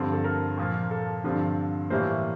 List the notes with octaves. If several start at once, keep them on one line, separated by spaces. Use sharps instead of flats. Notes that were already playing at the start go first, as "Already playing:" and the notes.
Already playing: G2 D3 F3 C4
A4
A#4
A#2 F3 A#3
A4
G2 D3 F3 C4
A2 E3 G3 A#3 C5